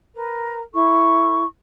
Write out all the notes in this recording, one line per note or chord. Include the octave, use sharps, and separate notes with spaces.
A#4 B4
E4 A4 C#6